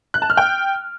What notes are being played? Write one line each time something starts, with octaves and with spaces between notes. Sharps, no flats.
F#6
A5
F6
G5